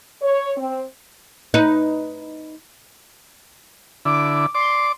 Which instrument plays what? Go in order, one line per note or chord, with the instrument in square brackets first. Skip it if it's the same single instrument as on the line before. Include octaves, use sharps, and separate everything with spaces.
[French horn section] C#5
C4
[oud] D#4 B4
[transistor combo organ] D3 E4 [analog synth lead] D6
[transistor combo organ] D5 D6 [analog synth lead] C6